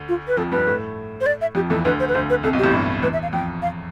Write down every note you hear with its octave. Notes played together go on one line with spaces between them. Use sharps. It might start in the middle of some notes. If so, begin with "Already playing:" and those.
Already playing: D2 D3
F4
B4
F2 F3 A4
G2 G3 B4
A2 A3
C5
D5
E5
F2 F3 G4
E2 E3 A4
D2 D3 B4
C5
B4
D2 D3 C5
B4
C2 C3 A4
B1 B2
G4
A1 A2
G1 G2
E2 B4
E5
F5
F2 G5
F5